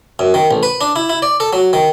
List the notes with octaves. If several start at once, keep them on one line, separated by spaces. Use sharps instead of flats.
F#2
D#3
A1
B4
D4
E4
E4
D5
A4
F#3
D#3